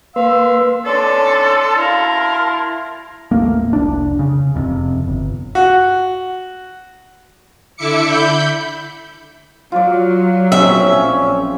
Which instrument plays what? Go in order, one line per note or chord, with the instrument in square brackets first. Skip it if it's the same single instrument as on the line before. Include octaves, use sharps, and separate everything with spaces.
[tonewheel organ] A#3 B4 C6 [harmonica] F5 E6
[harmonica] C#4 D4 D5 [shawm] A4 [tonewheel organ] A5 C6
[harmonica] E4 F5 [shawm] A#4
[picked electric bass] D#1 A1 A3 A#3
F1 C2 D4
C#3
E1 F2 G#2 C3
G1
[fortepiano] F#4
[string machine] D3 E4 E5 D6 C#7
B5 G6
[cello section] F#3 [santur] F4 D5
[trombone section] A#1 C#4 [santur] C4 G#4 [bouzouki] E5